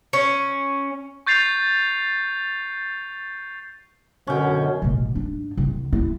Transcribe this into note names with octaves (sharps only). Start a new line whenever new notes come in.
C#4
C#6 G6 A6 C7 F7
F#2 B2 D3 C#4 G5
A1 B2
G#2 D4
C2
E4